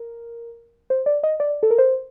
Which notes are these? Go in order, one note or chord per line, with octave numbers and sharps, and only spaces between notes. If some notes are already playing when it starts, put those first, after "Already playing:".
Already playing: A#4
C5
D5
D#5
D5
A4
A#4
C5